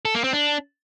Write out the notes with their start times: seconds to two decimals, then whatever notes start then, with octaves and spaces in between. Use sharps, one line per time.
0.05 A4
0.15 A#3
0.24 C4
0.33 D4